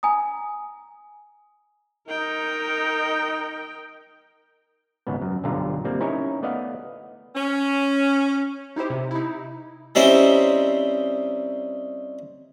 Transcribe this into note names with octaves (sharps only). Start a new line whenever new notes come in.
G#5 A#5 D#6
D#4 A#4 G5
G#1 C#2 G#2 B3
F#2
B1 G2 D3 F4 A#5
G3 A#3 C4
C#4 D#4 E4 A#4 C#5 G#5
A3 B3 D5 D#5 F5 F#5
C#4
D#4 E4 G4 C5
C3
D#4 E4
G3 C4 C#4 D#4 E4 C5